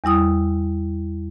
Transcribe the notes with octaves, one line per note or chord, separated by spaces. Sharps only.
E2 G3 E4 D#6